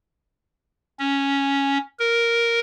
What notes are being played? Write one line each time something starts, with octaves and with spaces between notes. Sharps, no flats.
C#4
A#4